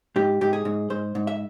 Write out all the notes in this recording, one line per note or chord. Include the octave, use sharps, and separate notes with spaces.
G#2 G4
G#2 G4
G#4
G#2
G#2 C5
G#2
E5